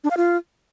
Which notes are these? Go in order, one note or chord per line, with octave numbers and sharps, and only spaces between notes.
D4
F5
F4